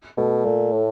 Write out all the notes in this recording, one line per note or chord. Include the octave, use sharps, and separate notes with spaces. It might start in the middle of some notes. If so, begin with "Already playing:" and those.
B2 A3
A#2 A3
A2